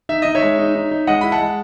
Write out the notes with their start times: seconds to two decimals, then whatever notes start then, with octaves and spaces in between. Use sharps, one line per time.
0.09 D#4 E5
0.22 D#4 D#5
0.35 C#5 E5
0.42 G#3
0.59 D#4
0.75 D#4
0.91 D#4
1.07 G#3 D#5 F#5
1.21 E4 B5
1.32 F#5 A5
1.40 G#3